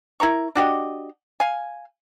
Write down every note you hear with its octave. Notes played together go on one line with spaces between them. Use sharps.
E4 A#4 A#5 C#6
D4 F#4 G4 D#5
F5 G#5